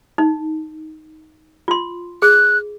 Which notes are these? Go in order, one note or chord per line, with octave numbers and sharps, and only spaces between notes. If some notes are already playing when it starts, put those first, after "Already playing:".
D#4
F4 C6
G#4 F#6